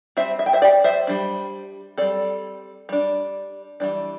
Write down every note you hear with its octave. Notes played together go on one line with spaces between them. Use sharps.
G3 C4 C5 E5
E5
G5
C5 E5
D5 G5
C5 E5
G3 D4
G3 C4 A4 D5
G3 D4
E3 G3 D4